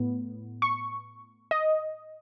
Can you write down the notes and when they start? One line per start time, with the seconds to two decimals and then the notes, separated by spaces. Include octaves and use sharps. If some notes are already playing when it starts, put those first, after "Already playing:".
Already playing: A2 B3
0.62 C#6
1.51 D#5